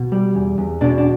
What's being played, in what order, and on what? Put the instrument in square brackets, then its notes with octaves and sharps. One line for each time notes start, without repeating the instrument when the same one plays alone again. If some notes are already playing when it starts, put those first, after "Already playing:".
Already playing: [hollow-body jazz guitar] B2
G3
E2
E2
B2 D4
D4